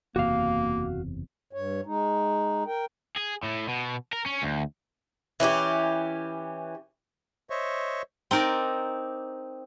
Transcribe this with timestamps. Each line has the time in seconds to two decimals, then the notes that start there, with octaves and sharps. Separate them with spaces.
0.16 F#1 E2 C3 A#3 F#4 F5
1.53 G2 C#5
1.86 G#3 D#4
2.67 A#4 G5
3.17 G#4
3.44 A2
3.69 B2
4.13 A#4
4.26 C#4
4.42 D2
5.40 E3 C#4 D#4 G4
7.50 C5 C#5 D#5 E5 C#6
8.31 C4 D#4 A#4 D5